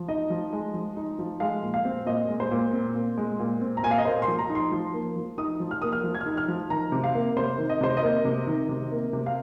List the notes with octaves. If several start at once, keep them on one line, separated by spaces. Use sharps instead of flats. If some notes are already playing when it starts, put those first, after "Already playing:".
Already playing: F3
D#4 D#5
F3
G#3
F3
D#4
F3
G#3 F5
A#2
F5
C4
A#2 D#5
G#3
C5
A#2
C4
A#2
G#3
A#2
C4
A#5
A#2 G#5
F5
D#5
A#3 C5
C6
F3
A#5
D#4
C6
F3
A#3
F3
D#4 D#6
F3
F6
A#3 D#6
F6
F3
G#6
F6
D#4
F6
F3
D#3 A#5
C3
F5
A#3
C3 C5
D#3
D#5
C3 C5
D#5
A#3
C3
D#3
C3
A#3
C3
F5